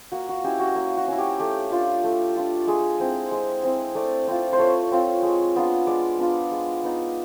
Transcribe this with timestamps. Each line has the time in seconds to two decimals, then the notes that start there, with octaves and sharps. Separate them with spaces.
0.12 A#3 F#4
0.29 F#4
0.44 C#4 E4 G4
0.60 F#4
0.76 A#3
0.97 F#4
1.08 C#4 E4
1.18 G4
1.39 A3 G4
1.72 D4 F4
2.04 A3
2.36 D4 F4
2.67 G#3 G#4
2.99 C4 E4
3.31 G#3
3.64 C4 E4
3.95 A3 D5
4.28 C4 F4
4.53 C5
4.59 A3 C#5
4.91 C4 F4
5.23 G#3
5.56 B3 D4 F4
5.87 G#3 D5
6.18 B3 D4 F4
6.52 G#3
6.83 B3 D#4